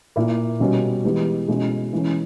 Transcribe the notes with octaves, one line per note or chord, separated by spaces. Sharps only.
A#2 A#3 E4
B2 G3 C#4
E3 G#3 B3 G4
B2 G#3 C#4 E4
E3 G#3 C#4